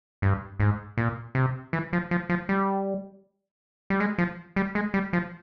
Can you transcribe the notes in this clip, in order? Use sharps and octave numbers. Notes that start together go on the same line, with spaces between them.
G2
G#2
A#2
C3
E3
F3
F3
F3
G3
G3
G#3
F3
G3
G#3
G3
F3